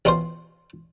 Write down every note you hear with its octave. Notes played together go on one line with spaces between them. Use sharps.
A1 B2 C#4 F4 C5